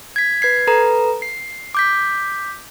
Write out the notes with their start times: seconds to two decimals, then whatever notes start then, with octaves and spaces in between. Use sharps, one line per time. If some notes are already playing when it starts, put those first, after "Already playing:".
0.16 G#6 B6
0.42 B4 G#6 C7
0.67 A4 B4 A#5
1.22 C7
1.75 D6 G6 B6